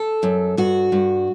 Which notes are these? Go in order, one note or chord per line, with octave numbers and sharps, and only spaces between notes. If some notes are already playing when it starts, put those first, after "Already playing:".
Already playing: A4
F#2
G2 F#4
G2